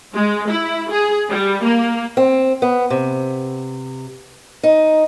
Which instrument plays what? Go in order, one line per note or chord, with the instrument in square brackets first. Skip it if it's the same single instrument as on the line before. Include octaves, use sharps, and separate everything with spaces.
[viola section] G#3
E4
G#4
G3
A#3
[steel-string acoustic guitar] C4
B3
C3
D#4